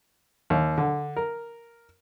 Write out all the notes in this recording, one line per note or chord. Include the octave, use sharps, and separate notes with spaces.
D#2
D3
A#4